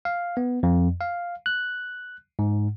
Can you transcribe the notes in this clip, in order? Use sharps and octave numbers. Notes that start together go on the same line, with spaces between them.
F5
B3
F2
F5
F#6
G#2